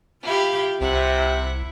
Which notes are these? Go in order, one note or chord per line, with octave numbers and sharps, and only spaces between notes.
E4 F4 G4 F5
C2 C3 E4 E5 F#5